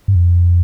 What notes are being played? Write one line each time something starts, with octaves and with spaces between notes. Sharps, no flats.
G2
F2